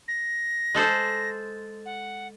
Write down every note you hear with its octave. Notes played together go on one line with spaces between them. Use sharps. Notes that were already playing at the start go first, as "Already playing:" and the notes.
A#6
G#3 A4 C5
F#5